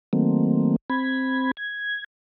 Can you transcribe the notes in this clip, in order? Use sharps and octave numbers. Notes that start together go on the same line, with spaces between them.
D#3 F#3 A3 A#3 C4
C4 B5 G#6
G#6